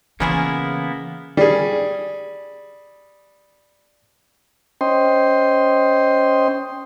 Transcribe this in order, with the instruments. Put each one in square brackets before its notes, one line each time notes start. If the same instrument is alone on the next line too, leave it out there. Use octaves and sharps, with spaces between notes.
[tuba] C#3 [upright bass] E3 [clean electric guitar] A#3 B3 E4 [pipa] C#4 F4 G#4
[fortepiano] G3 G#4
[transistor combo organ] C#4 C5 D#5 G5 C6